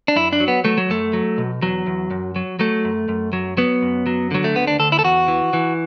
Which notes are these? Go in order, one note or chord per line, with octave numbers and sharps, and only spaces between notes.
D4
F#2 E4
D4
F#3
B3
F#3 A3
F#3
F#2 A3
F#3
B2
E2 F#3
E2
F#2
F#3
F#3 A3
F#2
F#2
F#3
F#3 B3
F#2
F#3
D3 F#3
A3
D2 B3
D4
D2 A4
E4
A4
E2 F#4
E3
E3